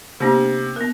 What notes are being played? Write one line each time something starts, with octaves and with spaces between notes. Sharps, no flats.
C3 A#3 B3 D4
B3 A#4